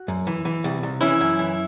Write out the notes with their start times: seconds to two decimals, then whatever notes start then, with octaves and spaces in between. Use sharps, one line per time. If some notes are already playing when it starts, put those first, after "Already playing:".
Already playing: F#4
0.08 F#2
0.27 E3
0.45 E3
0.64 C2
0.83 C2
1.01 E3 C#4 E4
1.21 F#2
1.39 E3